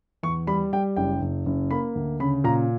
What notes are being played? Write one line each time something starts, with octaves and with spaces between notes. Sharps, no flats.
E2 C#6
G3 B5
G3 G5
F#1 G5
F#1
F#1
A#3 B5
D2
C#3 B5
A#2 A#5